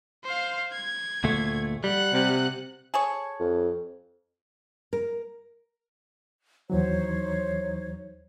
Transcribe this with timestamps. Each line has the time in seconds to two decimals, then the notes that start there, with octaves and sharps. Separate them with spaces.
0.24 C5 F5
0.73 G#6
1.24 D2 A#2 A3
1.84 G3 F#5 F#6
2.13 C3
2.94 G#4 A4 C#5
3.40 F2
4.93 A#4
6.70 D#2 E3 F#3 D#4 C5 C#5